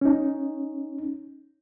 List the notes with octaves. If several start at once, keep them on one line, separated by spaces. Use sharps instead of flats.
C#4 D#4